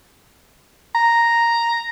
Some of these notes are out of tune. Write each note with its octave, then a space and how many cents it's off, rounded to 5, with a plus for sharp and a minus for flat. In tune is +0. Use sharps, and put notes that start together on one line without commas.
A#5 +0